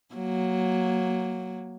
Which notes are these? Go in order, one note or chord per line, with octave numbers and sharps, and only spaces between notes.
F#3 A#3